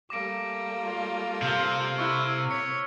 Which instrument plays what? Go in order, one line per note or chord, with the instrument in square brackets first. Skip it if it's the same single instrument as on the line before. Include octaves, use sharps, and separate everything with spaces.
[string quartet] G3 A3 A#3 [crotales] D6 A#6 D7
[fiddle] F4
[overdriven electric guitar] C3 [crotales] F6 G7
[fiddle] E4 [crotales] C#6 E6 F#6
[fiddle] C#5 [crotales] B6 C#7